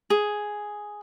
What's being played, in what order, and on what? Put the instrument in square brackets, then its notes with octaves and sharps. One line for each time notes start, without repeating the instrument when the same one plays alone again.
[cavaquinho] G#4